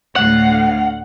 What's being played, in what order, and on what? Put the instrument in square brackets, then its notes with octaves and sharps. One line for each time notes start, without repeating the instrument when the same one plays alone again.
[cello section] D2 A2 F5 [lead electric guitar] F#5